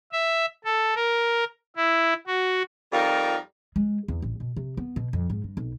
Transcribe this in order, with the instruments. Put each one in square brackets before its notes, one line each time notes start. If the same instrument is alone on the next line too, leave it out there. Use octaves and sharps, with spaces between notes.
[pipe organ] E5
A4
A#4
E4
F#4
[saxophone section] F2 G3 D#4 F4 A#4
[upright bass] G#3
E2
A1
B2
C3
B3
B2
F2
G#2
G2
B1